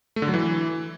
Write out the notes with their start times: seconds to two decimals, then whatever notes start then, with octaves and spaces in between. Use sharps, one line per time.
0.16 A3
0.22 D3
0.28 F#3
0.34 E3